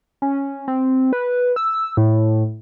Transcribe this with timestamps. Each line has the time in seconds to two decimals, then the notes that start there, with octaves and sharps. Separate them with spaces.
0.22 C#4
0.68 C4
1.13 B4
1.56 E6
1.97 A2